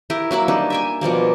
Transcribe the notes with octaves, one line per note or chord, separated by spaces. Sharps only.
E4 G4 A#4
F#3 A#3 E4 B5
G3 D4 D#4
E5 G5 G#5
B2 F3 G3 A#3